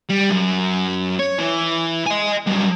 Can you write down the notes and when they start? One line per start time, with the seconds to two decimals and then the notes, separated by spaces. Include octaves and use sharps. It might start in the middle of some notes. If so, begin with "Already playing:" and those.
0.10 G3
0.31 F#2
1.19 C#5
1.39 E3
2.06 D#5 G#5
2.46 G2 F#3